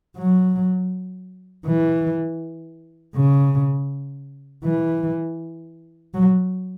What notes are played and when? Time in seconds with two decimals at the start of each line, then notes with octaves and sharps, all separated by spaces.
0.17 F#3
1.66 E3
3.15 C#3
4.64 E3
6.14 F#3